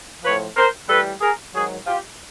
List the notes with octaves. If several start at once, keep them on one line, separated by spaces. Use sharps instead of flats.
A2 F3 B4 C#5
A#4 C5
A2 E3 G3 A4 B4
G#4 A#4
G#2 D#3 F#3 F#4 G#4
F4 G4